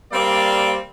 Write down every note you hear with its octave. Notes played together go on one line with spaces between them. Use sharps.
G3 A#3 C4 D5 F5